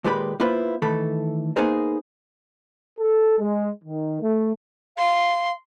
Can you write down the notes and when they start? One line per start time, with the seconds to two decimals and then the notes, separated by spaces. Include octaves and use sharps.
0.04 D#2 A#2 G#3 G4 B4 B5
0.40 A#3 B3 E4 F4 B4 C5
0.82 D#3 E3 A3 A4 B5
1.56 A#3 B3 D#4 G#4 A#4 C5
2.99 A4
3.39 G#3
3.83 D#3
4.21 A3
4.97 F5 C6